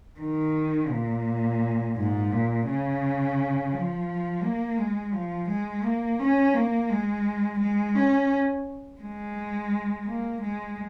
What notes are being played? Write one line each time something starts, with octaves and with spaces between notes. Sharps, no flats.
D#3
A#2
G#2
A#2
C#3
F3
A#3
G#3
F3
G#3
A#3
C#4
A#3
G#3
G#3
C#4
G#3
A#3
G#3